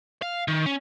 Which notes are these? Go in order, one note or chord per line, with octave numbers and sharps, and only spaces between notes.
F5
D#3
C#4